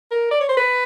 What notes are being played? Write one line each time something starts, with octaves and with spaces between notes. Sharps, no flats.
A#4
D5
C#5
C5
B4